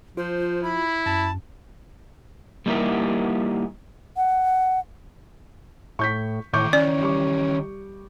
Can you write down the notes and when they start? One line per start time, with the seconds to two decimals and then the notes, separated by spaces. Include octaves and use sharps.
0.17 F3 F4 C5
0.63 E4 B5
1.06 F#2 A5
2.66 G3 A#3 D#4 E4 G4
4.17 F#5
5.99 A2 C#6 G6 B6
6.53 A2 D#3 E3 C#6 D6 G6
6.73 C#4 D5
7.01 G3 C#6 D6